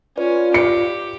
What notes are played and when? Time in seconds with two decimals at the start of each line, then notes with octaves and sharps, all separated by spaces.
0.18 C#4 F4 B4 D5
0.54 G4 C#7